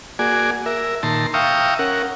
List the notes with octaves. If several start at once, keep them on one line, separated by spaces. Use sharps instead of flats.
A#3 F#4 G#4 D5 G#5
A#4 E5
A#2 D#3 A5 A#5 C6
E5 F5 G5 A#5 C#6 D#6
C#4 A#4 F#5